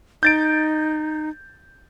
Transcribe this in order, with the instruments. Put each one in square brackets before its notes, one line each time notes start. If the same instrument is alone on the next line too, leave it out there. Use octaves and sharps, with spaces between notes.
[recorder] D#4 [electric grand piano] G6 A6 D7